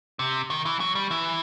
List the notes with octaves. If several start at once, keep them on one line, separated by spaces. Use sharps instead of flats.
C3
D#3
E3
F#3
G3
E3